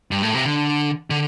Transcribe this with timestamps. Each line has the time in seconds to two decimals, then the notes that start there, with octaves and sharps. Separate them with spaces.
0.11 G2
0.23 A2
0.34 C3
0.45 D3
1.10 D3